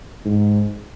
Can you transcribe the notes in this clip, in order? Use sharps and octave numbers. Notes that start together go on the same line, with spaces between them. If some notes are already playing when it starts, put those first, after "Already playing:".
G#2